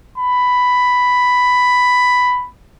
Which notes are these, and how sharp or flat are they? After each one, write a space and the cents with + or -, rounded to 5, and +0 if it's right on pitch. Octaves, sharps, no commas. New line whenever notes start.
B5 +5